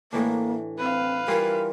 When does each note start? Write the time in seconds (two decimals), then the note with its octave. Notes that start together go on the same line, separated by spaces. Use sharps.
0.13 A2 E3 A#3 D4
0.79 C4 B4 F5
1.28 E3 G3 F4 A#4